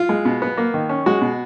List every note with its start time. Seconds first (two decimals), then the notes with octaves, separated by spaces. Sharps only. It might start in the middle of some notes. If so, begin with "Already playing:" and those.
Already playing: F4
0.09 G#3
0.25 B2
0.42 B3
0.58 A#3
0.74 D#3
0.89 C#4
1.06 G#3 F#4
1.21 B2